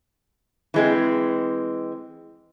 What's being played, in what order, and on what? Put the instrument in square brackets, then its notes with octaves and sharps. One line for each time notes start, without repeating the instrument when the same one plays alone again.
[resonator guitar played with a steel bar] E3 G#3 C4